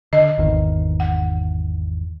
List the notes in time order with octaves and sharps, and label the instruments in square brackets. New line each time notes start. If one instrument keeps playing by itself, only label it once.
[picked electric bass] D3 [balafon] D#5
[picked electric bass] G#1 E2 D#3
[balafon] F#5